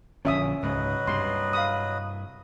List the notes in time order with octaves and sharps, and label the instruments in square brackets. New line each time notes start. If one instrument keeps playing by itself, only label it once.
[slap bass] A#1 D3 F3 [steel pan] C#4 E5 D#6
[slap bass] C#2 G#2 C#3 [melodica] F#3 B4 D#5
[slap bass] G2 C3 G3 [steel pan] C6
[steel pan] F5 B5 D#6